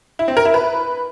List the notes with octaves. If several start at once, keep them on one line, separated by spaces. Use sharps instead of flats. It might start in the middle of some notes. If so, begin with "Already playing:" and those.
E4
C4
A#4
E4
B4